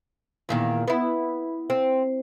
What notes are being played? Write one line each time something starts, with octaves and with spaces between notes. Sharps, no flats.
E2 A#2 D#3
B3 E4
C4